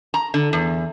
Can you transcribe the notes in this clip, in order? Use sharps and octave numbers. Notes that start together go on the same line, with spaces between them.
A#5
D3
E2